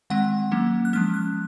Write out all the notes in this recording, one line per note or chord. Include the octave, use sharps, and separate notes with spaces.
D#3 G#3 C4 F#5
F#3 A#3 C#4
F#6
F3 G#3 C#4 F6
F#6